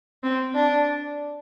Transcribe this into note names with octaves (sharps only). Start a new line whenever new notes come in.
C4
D4